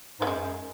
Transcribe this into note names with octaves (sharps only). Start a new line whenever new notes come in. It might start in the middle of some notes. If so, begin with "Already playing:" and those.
G#2 B3
F#2 G#3
F#2